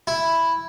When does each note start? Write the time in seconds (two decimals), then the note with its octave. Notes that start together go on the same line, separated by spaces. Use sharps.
0.07 E4